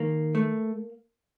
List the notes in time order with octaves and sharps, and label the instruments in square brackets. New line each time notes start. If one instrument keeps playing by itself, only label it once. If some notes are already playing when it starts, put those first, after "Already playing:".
Already playing: [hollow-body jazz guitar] D#3 A#3
A3